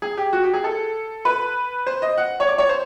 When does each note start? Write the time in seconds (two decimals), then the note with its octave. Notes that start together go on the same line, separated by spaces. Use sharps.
0.02 G#4
0.17 G4
0.33 F#4
0.43 G4
0.54 G#4
0.64 A4
1.25 B4
1.86 C5
2.02 D#5
2.18 F#5
2.40 C#5
2.48 D5
2.58 C#5
2.69 C5